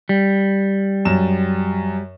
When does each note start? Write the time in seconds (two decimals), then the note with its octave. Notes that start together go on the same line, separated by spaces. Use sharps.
0.09 G3
1.05 F#2 E7